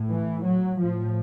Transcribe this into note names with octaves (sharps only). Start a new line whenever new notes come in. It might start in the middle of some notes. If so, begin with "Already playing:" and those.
Already playing: A2
E3
F#3
A2 F3